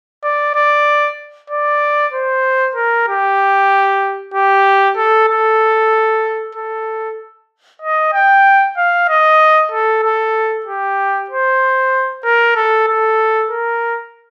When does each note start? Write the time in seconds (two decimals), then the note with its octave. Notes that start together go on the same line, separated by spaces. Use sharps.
0.24 D5
0.55 D5
1.50 D5
2.13 C5
2.75 A#4
3.08 G4
4.34 G4
4.97 A4
5.29 A4
6.55 A4
7.82 D#5
8.13 G5
8.77 F5
9.09 D#5
9.72 A4
10.03 A4
10.66 G4
11.30 C5
12.24 A#4
12.56 A4
12.88 A4
13.50 A#4